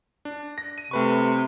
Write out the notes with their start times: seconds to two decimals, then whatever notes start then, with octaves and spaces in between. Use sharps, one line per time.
0.25 D4
0.58 A#6
0.78 D#7
0.91 C3 A3 B4 C#6